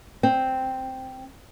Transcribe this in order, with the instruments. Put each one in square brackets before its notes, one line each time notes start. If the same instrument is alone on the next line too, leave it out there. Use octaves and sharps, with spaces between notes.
[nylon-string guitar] C4